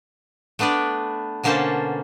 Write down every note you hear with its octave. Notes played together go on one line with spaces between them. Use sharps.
A3 B3 D4 B4 D5
B2 D3 A#3 C#4 C5 A5